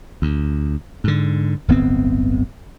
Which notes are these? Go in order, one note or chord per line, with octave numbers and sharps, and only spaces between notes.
D2
G#2 D3
D1 G1 B3 C4